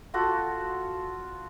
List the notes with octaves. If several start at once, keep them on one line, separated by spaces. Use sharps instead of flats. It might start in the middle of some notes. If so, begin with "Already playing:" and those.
F4 F#4 A4 C6